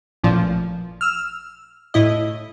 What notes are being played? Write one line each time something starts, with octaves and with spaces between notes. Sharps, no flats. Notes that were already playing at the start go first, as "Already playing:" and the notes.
A1 A#2 F3
E6 F6
A2 E4 D#5